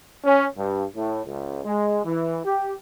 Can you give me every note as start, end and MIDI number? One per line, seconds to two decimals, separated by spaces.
0.25 0.45 61
0.57 0.84 43
0.95 1.21 45
1.25 1.60 37
1.64 1.99 56
2.05 2.38 52
2.45 2.72 67